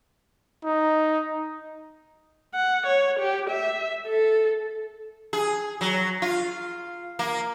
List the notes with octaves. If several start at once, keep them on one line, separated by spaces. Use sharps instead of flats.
D#4
F#5
C#5
G4
E5
A4
G#4
F#3
F4
A#3